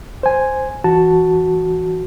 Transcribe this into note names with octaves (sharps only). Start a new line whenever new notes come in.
C5 G#5
E3 F#4 A5